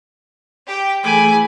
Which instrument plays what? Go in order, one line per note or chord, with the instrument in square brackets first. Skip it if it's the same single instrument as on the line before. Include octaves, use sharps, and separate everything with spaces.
[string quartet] G4 G5
[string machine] E3 A3 G#4 [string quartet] G#5 B5 D6